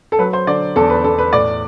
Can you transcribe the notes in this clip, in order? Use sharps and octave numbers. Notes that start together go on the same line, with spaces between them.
A4
F#3 B4
C5
D3 D5
E2 A4
B4
E2 A4
B4
A2 D5